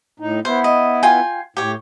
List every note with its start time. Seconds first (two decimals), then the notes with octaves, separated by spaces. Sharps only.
0.20 A2 D#4
0.45 B3 E4 C5
0.64 D#5
1.03 F4 G5 G#5
1.57 A2 G4 C#5